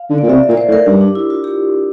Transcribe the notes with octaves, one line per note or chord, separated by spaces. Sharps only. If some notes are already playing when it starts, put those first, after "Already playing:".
Already playing: F5
D3
A#2 D5
C3 E5
E5
A#2
D5
C5
A2
A#4
G2 G4
D4
E4
F4
G4